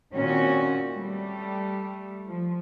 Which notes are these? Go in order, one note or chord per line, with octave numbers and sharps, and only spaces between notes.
A#2 D#3 C4 C#4 F#4
G3 A3
F3